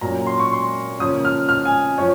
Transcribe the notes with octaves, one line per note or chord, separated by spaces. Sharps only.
A#2 F#3 C#4 A#5
C6
C#6
C6
C#3 F3 A#3 C#4 D#6
F6
F6
G#5
F3 C#5